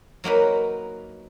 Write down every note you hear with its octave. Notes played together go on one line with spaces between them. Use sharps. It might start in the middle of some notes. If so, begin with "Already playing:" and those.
F#3 A#3 D#4 B4